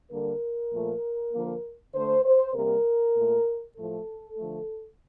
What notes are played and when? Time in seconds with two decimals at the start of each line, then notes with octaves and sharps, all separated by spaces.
0.11 D3 G3 A#3 A#4
0.72 A#2 F3 A3
1.32 D3 F3 A#3
1.94 D3 A3 C5
2.24 C5
2.54 C3 G3 A#3 A#4
3.17 A#2 A3
3.77 A2 F3 A3 A4
4.37 D3 F3 A3